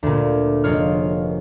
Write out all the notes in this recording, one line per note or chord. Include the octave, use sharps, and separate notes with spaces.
D2 A#2
F1 G#3 F4 G#4 C#5 F6